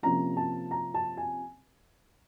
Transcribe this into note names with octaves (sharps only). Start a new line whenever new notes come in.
C3 F3 A#3 C#4 A#5
A5
A#5
A5
G#5